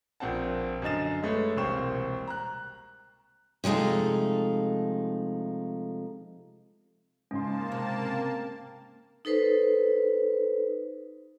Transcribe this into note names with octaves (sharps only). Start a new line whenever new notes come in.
A#1 A#3 C4 F#5 A5
F#2 D3 D#5 A6 E7
G#3 A3 B4 C#5
E1 C2 A#3 C4 C#6 E7
A#5 F#6
C3 F3 G#3 A3 D#4
G#2 C#3 A#3 C#4 A5 C6
C3
D#4 A4 B4 C5